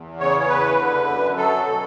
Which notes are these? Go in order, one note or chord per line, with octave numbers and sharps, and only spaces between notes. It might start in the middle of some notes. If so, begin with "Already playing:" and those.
Already playing: E2
C#3 C#5
C#5
E2 B4
D3
F#2
F#3 A4
B2